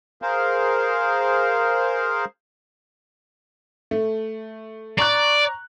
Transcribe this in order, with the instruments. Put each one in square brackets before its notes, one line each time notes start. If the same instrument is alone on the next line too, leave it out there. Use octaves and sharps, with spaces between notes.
[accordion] G#4 A#4 C5 F5
[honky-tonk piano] A3
[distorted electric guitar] D5 [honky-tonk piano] A#5 C#6 F#6